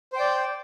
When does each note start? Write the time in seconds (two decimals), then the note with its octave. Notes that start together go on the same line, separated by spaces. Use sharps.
0.13 C5
0.16 G5
0.19 D5